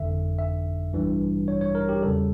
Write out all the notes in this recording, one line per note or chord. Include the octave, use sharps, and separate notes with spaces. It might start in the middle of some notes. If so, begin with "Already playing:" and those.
Already playing: G1 F2 D3 E5
E5
A1 G2 E3 G3
C#5
C#5
A#4
G4
E2 C#3 G3 A4